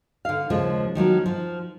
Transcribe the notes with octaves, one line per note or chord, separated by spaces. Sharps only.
D3 F5
D#2 C#3 F3 G#3
D#3 F3 F#3 A#3
F3